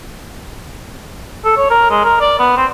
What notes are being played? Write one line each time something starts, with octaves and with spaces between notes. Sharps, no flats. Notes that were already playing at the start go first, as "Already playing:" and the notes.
A4
C#5
A#4
G#3
A#4
D5
B3
C4